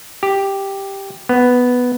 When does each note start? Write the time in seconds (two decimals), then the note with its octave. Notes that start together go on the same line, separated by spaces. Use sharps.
0.23 G4
1.29 B3